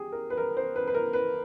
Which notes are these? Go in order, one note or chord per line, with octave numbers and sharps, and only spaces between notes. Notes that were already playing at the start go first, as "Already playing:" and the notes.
Already playing: G4 G#4
A#4
B4
A#4
C5
B4
B4
A#4
B4